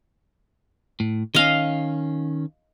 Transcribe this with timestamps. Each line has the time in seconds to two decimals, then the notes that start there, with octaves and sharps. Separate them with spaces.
1.00 A2
1.35 D#3 C#4 D#5 F5